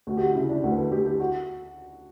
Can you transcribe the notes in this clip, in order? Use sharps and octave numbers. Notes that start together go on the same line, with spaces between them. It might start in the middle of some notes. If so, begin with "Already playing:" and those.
D2 F#4
G4
F#4
C#3 E4
D4
D2 F#4
B4
A4
D2 G4
G4
F#4